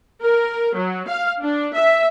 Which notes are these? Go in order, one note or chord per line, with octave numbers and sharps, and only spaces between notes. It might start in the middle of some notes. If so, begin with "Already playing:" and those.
A#4
F#3
F5
D4
E5